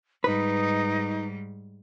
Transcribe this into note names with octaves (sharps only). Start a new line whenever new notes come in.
G#2 G3 D#4 B4